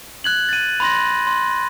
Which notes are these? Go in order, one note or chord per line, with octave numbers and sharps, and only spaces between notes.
F#6 G#6 F#7
A6 D#7
B5 C6 A#6
C6